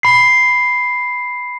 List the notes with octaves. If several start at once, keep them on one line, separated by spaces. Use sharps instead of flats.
B5 C7